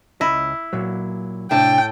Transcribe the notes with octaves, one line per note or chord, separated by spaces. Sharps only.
C#2 E4 D#5
A#2 F#3
A2 C3 D4 G5 A5